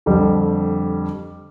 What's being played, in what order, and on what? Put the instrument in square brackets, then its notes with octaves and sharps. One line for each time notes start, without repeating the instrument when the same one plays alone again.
[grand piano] F2 D3 G3